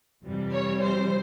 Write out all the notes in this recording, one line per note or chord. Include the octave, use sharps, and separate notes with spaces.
F2 C3 E3 G3
C#5
C5